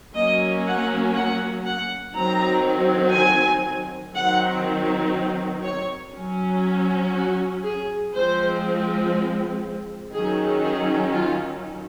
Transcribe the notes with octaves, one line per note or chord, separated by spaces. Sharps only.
F#3 A#3 C#4 D#5
F#5
F#5
F#5
D#3 F#3 C4 A#5
G#5
D#3 F#3 C4 F#5
C#5
F#3 C#4
F#4
G#4
F3 G#3 C4 C5
D#3 F#3 C#4 G#4
G#4
F4